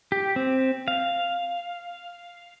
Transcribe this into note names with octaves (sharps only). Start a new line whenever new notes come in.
G4
C4
F5